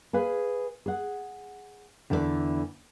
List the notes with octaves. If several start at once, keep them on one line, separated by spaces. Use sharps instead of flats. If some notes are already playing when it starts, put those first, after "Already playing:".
G#4 B4 F5 G#5
G#4 F#5
E2 D3 E3 A4 A#4 D5